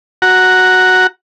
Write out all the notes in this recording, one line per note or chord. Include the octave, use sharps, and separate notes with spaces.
F#4 F#5 A#5